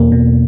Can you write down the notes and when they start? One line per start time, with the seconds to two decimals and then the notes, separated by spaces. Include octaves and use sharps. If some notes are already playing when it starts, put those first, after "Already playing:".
Already playing: E2 B2 A#3
0.12 B2